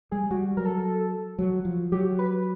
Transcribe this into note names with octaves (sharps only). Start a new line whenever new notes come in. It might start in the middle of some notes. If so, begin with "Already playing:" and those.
G3 G#4
G3 F#4
F#3 A#4
A4
F#3
F3
F#3 G4
B4